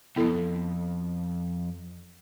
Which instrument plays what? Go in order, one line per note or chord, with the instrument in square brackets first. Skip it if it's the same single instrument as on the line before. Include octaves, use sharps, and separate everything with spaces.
[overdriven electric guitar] C2 F2 [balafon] B3 E4 A4